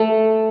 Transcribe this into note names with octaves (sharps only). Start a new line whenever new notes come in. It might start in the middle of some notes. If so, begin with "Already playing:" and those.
Already playing: A3